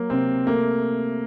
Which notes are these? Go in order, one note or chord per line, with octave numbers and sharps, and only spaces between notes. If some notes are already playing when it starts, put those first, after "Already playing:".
Already playing: F#3 A#3
C3 C4
A3 A#3